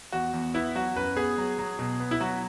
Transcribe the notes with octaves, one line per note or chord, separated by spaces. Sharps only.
E2 F#4
E2
B3 E4
F#3 F#4
F#2 B4
B3 G#4
F#3
F#3
B2
B3
E4
F#3 F#4